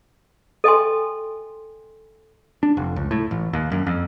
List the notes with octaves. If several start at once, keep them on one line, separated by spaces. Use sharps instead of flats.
A4 D#5 G5 G#5 C6
D4
F1
C#2
A2
A1
D#2
F#2
F2